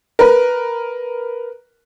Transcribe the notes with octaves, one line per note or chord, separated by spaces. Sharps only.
A#4 B4